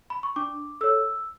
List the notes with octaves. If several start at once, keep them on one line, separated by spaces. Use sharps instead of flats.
B5
C#6
D4 D6
A4 C#5 E6